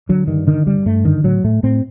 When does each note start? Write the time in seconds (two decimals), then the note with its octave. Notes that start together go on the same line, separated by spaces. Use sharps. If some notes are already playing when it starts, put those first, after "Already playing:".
0.09 D3 F#3
0.27 G2 D#3
0.47 D3 D#3
0.67 G2 G3
0.86 G2 A3
1.05 D3 D#3
1.24 A2 F#3
1.44 A2 A3
1.63 A2 C4